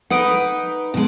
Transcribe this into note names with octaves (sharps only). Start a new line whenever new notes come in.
D#4 B4 F#5 D#6 D7
B2 G#3